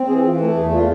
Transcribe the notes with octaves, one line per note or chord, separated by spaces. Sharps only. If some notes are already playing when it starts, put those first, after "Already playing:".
Already playing: C4
E3 G#4
E3 F4
A3 A4
E2 G#4
F4